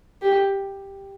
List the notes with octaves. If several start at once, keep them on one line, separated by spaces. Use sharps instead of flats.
G4